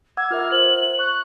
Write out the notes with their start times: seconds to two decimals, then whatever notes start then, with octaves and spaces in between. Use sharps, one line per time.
0.17 F#5 D6 E6 G#6
0.31 F4 A#4 E5 F6
0.52 C5 F#7
0.99 C#6 F#6